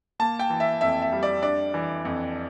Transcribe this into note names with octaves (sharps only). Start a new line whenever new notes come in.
A#3 A5
G5
E3
E5
F2 E5
E5
G3
D5
D4 D5
E3
F2